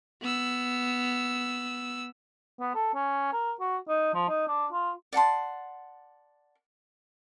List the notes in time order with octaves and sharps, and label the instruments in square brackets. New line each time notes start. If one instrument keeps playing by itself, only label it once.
[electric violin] B3 E6
[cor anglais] B3
A4
C#4
A#4
F#4
D#4
F3
D#4
D4
F4
[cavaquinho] D5 F#5 A5 C6